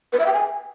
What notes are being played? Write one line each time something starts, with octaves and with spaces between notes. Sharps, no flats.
B4
E5
G5
G#5